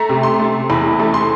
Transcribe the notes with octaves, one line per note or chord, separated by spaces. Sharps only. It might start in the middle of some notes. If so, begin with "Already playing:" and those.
Already playing: A3 A#5
C3
C6
A3
E2 B5
A3
C6